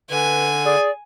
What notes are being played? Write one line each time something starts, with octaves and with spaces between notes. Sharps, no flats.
D3 B4 G#5
G#4 D5